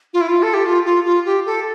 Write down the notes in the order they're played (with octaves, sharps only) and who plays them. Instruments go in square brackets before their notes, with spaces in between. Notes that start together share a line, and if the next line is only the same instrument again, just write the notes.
[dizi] F4
E4
F4
A4
G4
F4
F4
F4
G4
A4